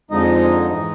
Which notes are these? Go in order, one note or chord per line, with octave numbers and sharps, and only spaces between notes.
F2 D3 F3 G#3 D#4 D#5
G#2 E3 G#3